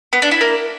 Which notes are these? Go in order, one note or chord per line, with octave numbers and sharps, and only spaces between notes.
B3
D4
E4
A#3